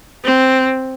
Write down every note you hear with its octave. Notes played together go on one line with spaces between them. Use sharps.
C4